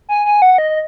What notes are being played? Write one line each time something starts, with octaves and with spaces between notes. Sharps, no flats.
G#5
G#5
F#5
D#5